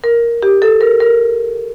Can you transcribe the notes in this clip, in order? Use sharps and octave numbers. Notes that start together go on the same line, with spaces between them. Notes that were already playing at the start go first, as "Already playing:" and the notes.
A#4
G4
A4
A#4
A#4